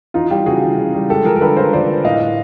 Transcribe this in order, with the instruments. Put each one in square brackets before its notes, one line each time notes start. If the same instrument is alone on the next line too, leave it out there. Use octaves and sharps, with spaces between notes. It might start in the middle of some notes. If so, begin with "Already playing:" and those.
[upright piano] E3 D#4 F4
G3 F4 G4
C#3 F#4 G#4
E3
C#3
G3
G#3 G4 A4
F3 G#4 A#4
A#4
D3 A4 B4
F3 A#4 C5
F3 C5 D5
F3
A2 D#5 F5
A2